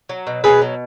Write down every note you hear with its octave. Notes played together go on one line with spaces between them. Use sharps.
F#3
B2
B2 G#4 B4
F#3